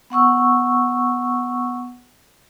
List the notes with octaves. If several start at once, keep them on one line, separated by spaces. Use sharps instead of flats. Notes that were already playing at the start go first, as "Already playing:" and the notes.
B3 F#5 C#6 E6